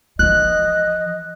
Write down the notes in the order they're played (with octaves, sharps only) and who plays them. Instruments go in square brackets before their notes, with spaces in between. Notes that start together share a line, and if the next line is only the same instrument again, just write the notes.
[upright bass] E3 F3 [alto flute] D#5 [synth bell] F#6